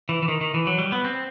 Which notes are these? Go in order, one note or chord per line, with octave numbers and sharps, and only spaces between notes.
E3
E3
D#3
D#3
E3
F#3
G3
B3
C4